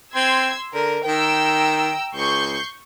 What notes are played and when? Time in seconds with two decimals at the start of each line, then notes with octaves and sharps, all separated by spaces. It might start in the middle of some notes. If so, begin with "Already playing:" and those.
0.15 C4 C6 E6 G#6
0.74 D3 A#4
1.07 D#3 G5 A#5 E6
2.15 C#2 C#6 G6 C7